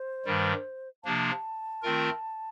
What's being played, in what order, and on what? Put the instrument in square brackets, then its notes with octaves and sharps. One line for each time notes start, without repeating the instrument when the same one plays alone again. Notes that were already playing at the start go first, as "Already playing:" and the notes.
Already playing: [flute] C5
[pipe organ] G2 D#3 G3
[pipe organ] C3 F3 A#3 D4 [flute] A5
[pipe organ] D#3 A3 C4 F4 A#4